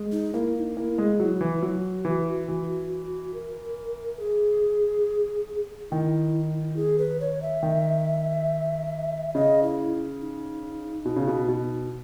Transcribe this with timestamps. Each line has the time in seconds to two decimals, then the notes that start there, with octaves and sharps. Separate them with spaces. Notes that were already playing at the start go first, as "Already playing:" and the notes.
Already playing: G#3
0.12 D#4
0.33 A#3 E4
0.55 E4
0.59 D#4
0.77 A#3 E4
0.98 G#3
1.20 F#3
1.41 E3
1.62 F#3 F#4
2.05 E3
2.48 E3
3.34 A#4
4.19 G#4
5.91 D#3 E4
6.76 G#4
6.98 B4
7.20 C#5
7.42 E5
7.63 D#3
9.34 C#3 D#5
9.63 E4
10.20 D#4
11.05 B2
11.16 C#3
11.27 B2
11.48 B2